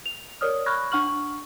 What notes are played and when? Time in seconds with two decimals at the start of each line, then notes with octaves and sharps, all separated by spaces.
0.06 F7
0.41 A#4 C#5 D5 D#6 F6
0.66 B5 C#6 F6 F#6 G#6 A#6
0.92 D4 F#5 C#6 F6 F#7